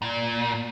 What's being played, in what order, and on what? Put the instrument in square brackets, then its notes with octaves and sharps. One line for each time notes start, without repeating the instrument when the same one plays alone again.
[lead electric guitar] A#2